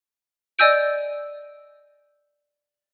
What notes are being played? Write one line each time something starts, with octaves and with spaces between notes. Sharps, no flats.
D5 D#5 G#5 E6 G6 D7